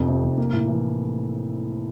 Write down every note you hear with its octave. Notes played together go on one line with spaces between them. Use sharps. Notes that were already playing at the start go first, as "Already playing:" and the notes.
Already playing: F1 F2
C3
F1
A#3
A2
E3